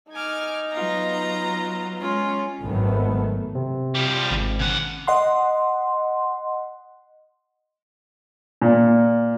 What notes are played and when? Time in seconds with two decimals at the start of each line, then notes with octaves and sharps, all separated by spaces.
0.11 D#4 G#5 D6 F6
0.73 F#3 B3 F4 A#5
2.01 G#3 C#4 F4
2.62 G#1 G#2 D#3 F#3 A3 B3
3.55 C3
3.95 F3 G3
4.31 G#1
4.59 C#3 F#5
5.07 D#5 F#5 C6
8.62 A#2